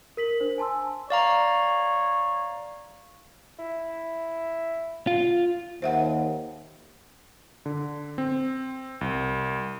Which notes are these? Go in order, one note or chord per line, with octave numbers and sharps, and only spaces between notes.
A#4 B6 F#7
D4 C5
G#5 A5 C6 E6
C#5 D5 F5 A#5
E4
F4
D#2 C5 E5 F#5
D3
C4
C2